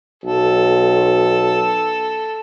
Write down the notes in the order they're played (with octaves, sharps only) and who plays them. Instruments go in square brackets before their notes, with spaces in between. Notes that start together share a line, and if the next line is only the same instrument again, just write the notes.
[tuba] B1 [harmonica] A4